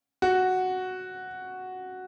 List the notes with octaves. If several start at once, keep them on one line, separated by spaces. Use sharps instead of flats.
F#4